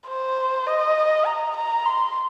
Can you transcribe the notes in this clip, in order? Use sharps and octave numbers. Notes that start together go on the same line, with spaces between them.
C5
D#5
A#5
A#5
C6